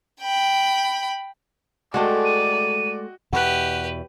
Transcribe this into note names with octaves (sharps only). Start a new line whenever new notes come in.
G5 B5
G#3 A3 F#4 A4 D5 D#5 G5
D#7
E2 B2 G4 B4 F#5 F#6